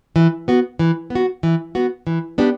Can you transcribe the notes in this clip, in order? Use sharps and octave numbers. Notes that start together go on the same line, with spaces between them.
E3
B3 F#4
E3
B3
F#4
E3
B3 F#4
E3
B3 D4 G4